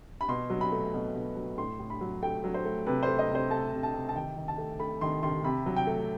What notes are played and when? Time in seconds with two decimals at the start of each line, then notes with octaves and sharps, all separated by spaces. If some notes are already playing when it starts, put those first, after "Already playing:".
0.21 B5
0.28 B2 C6
0.50 F#3
0.61 B5
0.72 A3
0.94 B2
1.15 B2
1.36 F#3
1.58 A2 C6
1.79 A2
1.90 B5
2.01 F#3
2.22 A3 G5
2.44 F#3
2.54 C5
2.65 A3
2.86 C3 B4
3.03 C5
3.08 A3
3.19 D#5
3.30 C3
3.35 C5
3.51 A3 A5
3.73 C3
3.83 A5
3.94 C3
4.09 A5
4.16 D#3 G5
4.37 D#3
4.48 A5
4.58 A3
4.80 A3 B5
5.01 D#3 C6
5.23 D#3 C6
5.44 C3 B5
5.66 F#3
5.76 G5
5.87 A3